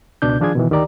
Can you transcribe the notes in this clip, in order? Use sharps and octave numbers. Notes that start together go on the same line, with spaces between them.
C#2 B2 D4 G6
D#3 F3 D4 F4 G#4 G#6
B2 D#3 E3
D2 D#3 G4 D5 A#5